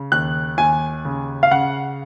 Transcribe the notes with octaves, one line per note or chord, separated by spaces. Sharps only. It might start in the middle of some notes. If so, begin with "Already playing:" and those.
Already playing: C#3
D#2 F#6
D#2 G#5
C#3
F5
C#3 F#5